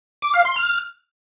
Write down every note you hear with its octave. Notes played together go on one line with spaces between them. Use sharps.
D6
F5
C6
F6